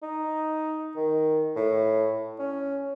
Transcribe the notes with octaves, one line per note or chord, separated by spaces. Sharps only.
D#4
D#3
A2
C#4